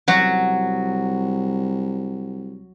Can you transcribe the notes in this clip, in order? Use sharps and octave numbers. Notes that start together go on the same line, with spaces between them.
C2 F#3 F#4